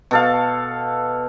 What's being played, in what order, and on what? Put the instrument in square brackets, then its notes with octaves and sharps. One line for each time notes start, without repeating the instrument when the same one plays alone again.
[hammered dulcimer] B2 A4 F5